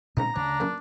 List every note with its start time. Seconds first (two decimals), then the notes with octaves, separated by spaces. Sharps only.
0.17 C2 A#2 C#3 G#3 C4 D#4 A#5
0.36 D2 C#3 A3 D4 C#5
0.60 C#2 F#2 A#2